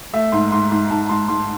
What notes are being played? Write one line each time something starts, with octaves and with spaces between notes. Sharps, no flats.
A3 E5
G#2 C6
G#2 C6
G#2 C6
G#2 A5
G#2 C6
G#2 C6